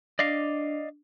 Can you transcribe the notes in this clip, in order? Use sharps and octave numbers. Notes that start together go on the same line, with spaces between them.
D4 D5 D#5 F5